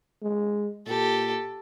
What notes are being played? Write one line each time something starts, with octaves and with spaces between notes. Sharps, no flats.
G#3
A#2 G4 A4